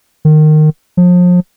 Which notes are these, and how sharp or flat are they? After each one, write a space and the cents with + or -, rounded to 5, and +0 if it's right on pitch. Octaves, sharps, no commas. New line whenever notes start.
D#3 -20
F3 +35